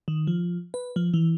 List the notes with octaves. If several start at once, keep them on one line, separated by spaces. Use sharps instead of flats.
D#3
F3
B4
F3
E3